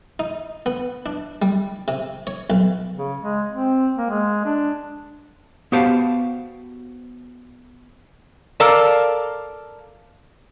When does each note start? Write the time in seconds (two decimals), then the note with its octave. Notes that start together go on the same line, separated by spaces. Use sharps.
0.19 D#4
0.66 B3
1.06 D4
1.42 G3
1.88 C3
2.27 C#5
2.50 B1
2.96 C#3
3.20 G#3
3.52 C4
3.97 A#3
4.10 G#3
4.45 D4
5.72 B3 F#4 G4 C5 F5 A5
8.60 A4 A#4 D5 F5 A5